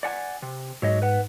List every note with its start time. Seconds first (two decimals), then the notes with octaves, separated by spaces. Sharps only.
0.03 D5 F#5 G#5
0.42 C3
0.82 G#2 F#3 C#5 D#5
1.02 B4 F#5